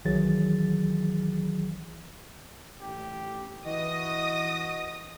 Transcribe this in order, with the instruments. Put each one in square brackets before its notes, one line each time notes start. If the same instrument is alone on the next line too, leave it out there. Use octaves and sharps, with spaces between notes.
[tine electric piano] B1 D#3 E3 F#3 G#4 A6
[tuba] A1 [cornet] G4
[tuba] E3 [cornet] F#4 [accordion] D#5 [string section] D#6 A#6